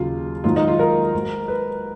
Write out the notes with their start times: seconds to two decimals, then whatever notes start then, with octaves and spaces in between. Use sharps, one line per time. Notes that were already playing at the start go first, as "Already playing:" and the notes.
Already playing: D#2 C#3 F#3 F4
0.44 G#2 D#3 F#3 F4
0.56 D#4
0.68 F4
0.79 A#4
1.14 G#2 F#3
1.48 B4